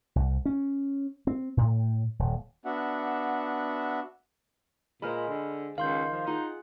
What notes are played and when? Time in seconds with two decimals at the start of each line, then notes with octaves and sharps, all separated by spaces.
0.16 C2
0.45 C#4
1.27 C4
1.57 A2
2.19 D#1
2.65 B3 D4 F#4 E5 F#5
5.02 A#2 G#3 C5 B5 F6
5.28 D3
5.78 C#2 D#3 F5 C6 G6
6.11 F3
6.27 D#4 F4 G#4 F#5